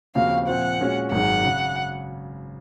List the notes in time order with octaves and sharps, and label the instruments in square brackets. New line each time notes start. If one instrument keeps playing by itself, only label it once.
[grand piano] D#2 C#3 F3 C4 F#4 [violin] F5
[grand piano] A#2 F3 C4 F4 C5 [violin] F#5
[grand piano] A#2 G#3 C#4 F#4 C#5
[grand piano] G#1 F#2 D#3 G#3 [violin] F#5
[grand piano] C#3